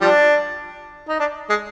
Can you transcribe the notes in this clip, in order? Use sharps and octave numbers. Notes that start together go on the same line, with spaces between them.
F3 G3 D4
D#4
D4
G#3